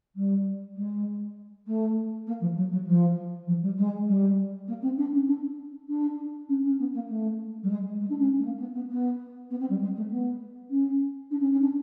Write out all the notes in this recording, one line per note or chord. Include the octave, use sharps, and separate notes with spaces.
G3
G#3
A3
A#3
F3
F#3
F#3
F3
F3
G3
G#3
G3
A#3
C4
D4
C#4
D4
D4
C#4
C#4
B3
A#3
A3
G3
G#3
G#3
D4
C#4
A3
A#3
B3
B3
B3
B3
C4
G3
G#3
A3
B3
C#4
D4
C#4
C#4
D4